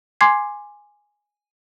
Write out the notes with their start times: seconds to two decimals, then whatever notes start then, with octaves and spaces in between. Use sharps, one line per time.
0.21 G#5 C6 D6 G#6 C7